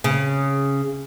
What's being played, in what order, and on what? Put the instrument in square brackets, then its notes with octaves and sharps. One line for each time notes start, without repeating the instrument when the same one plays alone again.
[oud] C#3